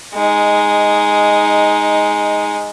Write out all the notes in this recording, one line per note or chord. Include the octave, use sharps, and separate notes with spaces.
G#3 D#4